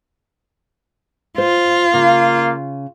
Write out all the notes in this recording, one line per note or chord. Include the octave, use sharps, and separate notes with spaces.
F4 C5
C#3 A#3